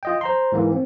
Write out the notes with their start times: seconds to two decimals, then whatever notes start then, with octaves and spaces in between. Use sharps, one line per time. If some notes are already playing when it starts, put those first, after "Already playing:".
0.03 F4 D#5 G5
0.21 C5 A#5 C6
0.52 G#2 E3 A#3
0.72 C4